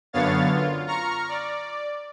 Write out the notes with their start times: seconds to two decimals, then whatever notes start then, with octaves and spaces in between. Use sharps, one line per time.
0.13 F#2 D3 B3 C#5 F5 A6
0.55 F4
0.87 A#5 C#6 F6
1.28 D5